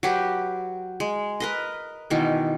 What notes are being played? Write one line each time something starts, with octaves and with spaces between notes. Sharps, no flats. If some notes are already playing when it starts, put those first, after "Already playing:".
F#3 G4 B4
G#3
A#4 B4 D#5
B2 D#3 E3